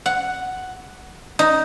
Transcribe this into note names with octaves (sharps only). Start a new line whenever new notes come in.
F#5
D#4